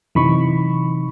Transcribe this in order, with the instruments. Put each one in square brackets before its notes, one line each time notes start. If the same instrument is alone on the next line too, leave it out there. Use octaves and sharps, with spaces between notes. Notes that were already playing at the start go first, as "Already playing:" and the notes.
[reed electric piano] F#2 C3 D#4 [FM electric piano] E3 B5 C#6